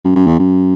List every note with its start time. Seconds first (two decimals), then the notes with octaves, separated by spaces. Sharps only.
0.05 F#2
0.16 F#2
0.27 E2
0.39 F#2